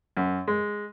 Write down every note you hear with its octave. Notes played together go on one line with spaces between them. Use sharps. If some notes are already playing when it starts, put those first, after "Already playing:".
F#2
G#3